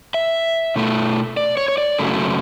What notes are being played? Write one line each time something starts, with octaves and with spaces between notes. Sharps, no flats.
E5
B2 A3
D5
C#5
C#5
D5
F#2 C#3 F#3 A3